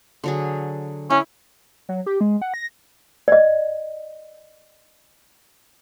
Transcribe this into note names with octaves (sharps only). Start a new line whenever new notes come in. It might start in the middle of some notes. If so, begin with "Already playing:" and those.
D3 F#3 G#4
C#4 E4
F#3
G4
G#3
F#5
A#6
D5 D#5